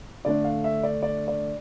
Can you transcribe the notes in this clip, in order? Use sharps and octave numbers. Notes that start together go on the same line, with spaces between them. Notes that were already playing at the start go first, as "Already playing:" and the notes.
D3 A3 D4 D5
F5
E5
D5
D5
D5